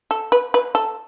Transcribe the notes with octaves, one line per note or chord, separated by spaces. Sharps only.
A4
B4
B4
A4